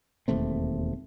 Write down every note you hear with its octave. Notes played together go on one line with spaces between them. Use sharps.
E1 D#2 A3 C4